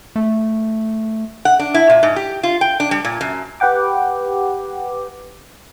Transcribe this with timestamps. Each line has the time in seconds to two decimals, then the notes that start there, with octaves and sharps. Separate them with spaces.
0.16 A3
1.45 F#5
1.59 D4
1.74 E4
1.90 A#2
2.03 G#2
2.16 G4
2.43 F4
2.61 G5
2.80 D4
2.91 G3
3.05 A#2
3.21 F#2
3.60 G4 B4 F#5 G5 D6